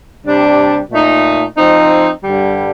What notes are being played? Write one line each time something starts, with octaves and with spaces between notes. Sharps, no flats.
C3 G3 D4
A#2 A3 D#4
F3 C4 D#4
G2 D3 G3